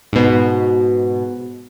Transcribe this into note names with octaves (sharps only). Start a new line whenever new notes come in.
G#2 B2